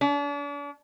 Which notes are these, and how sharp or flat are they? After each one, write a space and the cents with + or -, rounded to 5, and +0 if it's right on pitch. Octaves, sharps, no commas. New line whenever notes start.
D4 -40